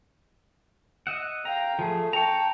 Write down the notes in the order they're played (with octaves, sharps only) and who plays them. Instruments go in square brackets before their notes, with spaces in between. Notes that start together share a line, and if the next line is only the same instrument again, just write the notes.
[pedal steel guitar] D#5 E5 F#5
[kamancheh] F5 G5 [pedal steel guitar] A#5
[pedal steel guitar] F3 G#4 [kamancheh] A3
[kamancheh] G5 A5 [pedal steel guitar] A#5 C#6